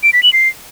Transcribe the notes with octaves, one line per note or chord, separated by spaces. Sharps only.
D7
B6
F#7
C7